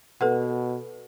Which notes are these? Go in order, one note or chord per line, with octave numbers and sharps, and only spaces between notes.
B2 A4 B4 F#5